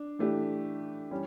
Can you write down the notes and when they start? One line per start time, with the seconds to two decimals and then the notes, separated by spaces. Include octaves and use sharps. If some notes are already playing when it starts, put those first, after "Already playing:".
Already playing: D4
0.19 E3 A3 D4 G4
1.11 E3 G3 C#4